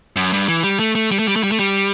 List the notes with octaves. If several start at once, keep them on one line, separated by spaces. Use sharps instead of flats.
F#2
G2
E3
G3
A3
A3
G3
A3
G3
A3
G3
A3
G3